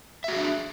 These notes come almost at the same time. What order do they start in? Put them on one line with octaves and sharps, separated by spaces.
E5 F#4 G#4 D4